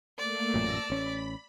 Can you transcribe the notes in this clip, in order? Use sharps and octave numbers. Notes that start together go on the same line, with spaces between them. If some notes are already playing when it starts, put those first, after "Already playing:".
A3 A#3 D5
A1 F#2 A#2 A5 E6 A#6
A1 C#4 B5